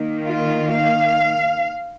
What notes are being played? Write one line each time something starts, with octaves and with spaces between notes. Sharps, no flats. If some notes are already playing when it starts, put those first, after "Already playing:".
Already playing: D#3 A#3
F4
F5